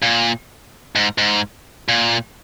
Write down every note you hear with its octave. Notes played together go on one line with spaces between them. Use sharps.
A#2
G#2
G#2
A#2